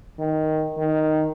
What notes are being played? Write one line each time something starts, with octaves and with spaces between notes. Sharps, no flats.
D#3
D#3